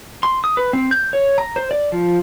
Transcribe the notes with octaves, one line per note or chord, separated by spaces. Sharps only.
C6
D#6
B4
C4
G6
C#5
A#5
C5
D5
F3